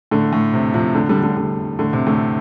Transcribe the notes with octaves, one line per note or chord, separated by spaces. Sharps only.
A2 D3
A2
C3
C3 F3
A2 D3
D3 G3
D3 G3
D3 G3
A2 D3
C3
A2 D3